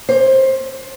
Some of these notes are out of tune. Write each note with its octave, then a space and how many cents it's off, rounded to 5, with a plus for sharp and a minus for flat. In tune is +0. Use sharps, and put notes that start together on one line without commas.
C#4 +0 C5 +20